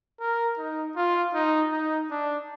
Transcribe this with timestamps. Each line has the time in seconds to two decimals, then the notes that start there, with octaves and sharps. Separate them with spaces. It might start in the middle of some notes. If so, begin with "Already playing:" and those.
0.20 A#4
0.58 D#4
0.96 F4
1.34 D#4
1.72 D#4
2.11 D4